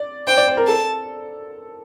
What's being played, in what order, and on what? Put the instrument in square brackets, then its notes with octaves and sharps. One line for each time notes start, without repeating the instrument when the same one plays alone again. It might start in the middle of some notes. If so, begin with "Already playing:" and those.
Already playing: [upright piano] D5
[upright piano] C5 [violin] G5
[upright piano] D5
C5
A#4
[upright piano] A4 [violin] A5